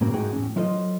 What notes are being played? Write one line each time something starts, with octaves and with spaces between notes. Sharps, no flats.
A2 C#3 A#3 C4 F#4
G#2 A3 D#4 F#4 G#4 G5
E2 A2 C#4
F#3 E4 F4 A4 C5 D#5